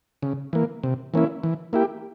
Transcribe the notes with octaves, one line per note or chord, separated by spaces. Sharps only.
C#3
E3 A#3
C3
E3 A#3 C#4 E4
E3
A#3 E4 G4